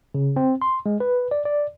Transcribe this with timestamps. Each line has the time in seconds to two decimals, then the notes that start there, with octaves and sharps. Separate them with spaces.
0.15 C#3
0.36 C4
0.62 C6
0.86 G#3
1.00 B4
1.31 D5
1.45 D5